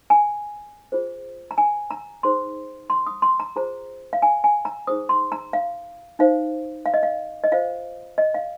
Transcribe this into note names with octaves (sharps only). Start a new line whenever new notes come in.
G#5
F4 G#4 C5
A#5
G#5
A#5
D#4 G#4 C5 C6
C6
D#6
C6
A#5
F4 G#4 C5 A#5
F5
G#5
G#5
A#5
D#4 G#4 C5 D#6
C6
A#5
F5
D#4 C5 F5
F5
D#5
F5
D#5
F4 C5 F5
D#5
F5